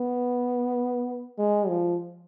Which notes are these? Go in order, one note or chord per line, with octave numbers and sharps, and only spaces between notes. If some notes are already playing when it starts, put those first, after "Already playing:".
Already playing: B3
G#3
F3